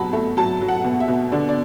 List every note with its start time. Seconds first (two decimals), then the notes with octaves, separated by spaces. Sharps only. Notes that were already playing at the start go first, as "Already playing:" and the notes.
Already playing: B2 F#3 F#5 A5 B5
0.13 A3
0.37 F#3 A5
0.61 F#3
0.68 F#5
0.84 B2
1.00 E5
1.08 B2
1.32 D3 D5
1.49 D5